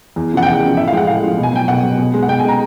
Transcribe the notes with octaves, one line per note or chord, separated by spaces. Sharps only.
E2
C#3 F3 F#5
G5
E2 F#5
C#3 F3
A2 E5
F5
F3 G#3 G5
F#5
A2 F5
F3 G#3
B2
G#5
F#3 G5
B2 F#5
F#3
B2
G#3
F#5
B2 G5
G#5
G#3 A#5